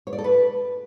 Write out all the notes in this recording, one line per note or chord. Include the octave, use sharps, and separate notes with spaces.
C#5
D5
A4
B4